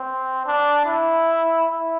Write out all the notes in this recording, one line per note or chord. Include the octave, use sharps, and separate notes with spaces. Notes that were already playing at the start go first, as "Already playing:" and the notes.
Already playing: C4
D4
E4
E4